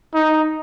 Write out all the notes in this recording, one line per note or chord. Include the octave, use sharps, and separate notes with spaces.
D#4